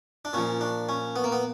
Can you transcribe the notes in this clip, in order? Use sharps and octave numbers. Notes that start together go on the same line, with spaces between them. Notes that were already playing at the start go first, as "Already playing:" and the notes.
D4
A#2 F3 C#4
D4
C#4
B3
A#3
B3